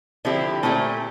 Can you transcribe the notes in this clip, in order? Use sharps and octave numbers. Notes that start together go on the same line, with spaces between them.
D3 F3 C4 E4 G4
A#2 A3 C4 E4 G4